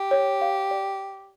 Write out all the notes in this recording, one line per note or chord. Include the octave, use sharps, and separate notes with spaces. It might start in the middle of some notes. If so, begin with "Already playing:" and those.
Already playing: G4
C#5
F5
D5